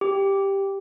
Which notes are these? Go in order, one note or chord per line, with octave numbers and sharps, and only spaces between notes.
G4